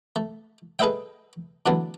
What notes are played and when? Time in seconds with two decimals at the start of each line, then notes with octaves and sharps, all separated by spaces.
0.16 A3
0.79 G#4 A4 B4 D#5 E5 G5
1.66 D3 E3 F#3 A3 B3 D4